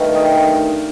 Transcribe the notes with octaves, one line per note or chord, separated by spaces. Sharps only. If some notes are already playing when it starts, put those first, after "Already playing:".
Already playing: G2 D#3 A3 F5
D#5 G5